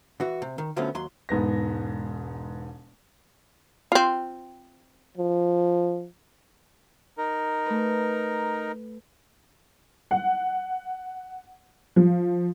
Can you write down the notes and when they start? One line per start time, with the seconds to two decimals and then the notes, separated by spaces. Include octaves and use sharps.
0.20 E3 F#4
0.42 C3
0.58 D#3
0.76 D3 F3 F#3 A3 B3 C#4
0.95 D#2 F#3 C6
1.29 E1 G#2 B3 A#6
3.92 C4 F4
5.18 F3
7.18 D#4 A#4
7.66 A3 B4
10.11 F#5
11.96 F3